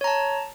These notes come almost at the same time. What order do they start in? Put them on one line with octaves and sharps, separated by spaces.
C#5 A#5 A5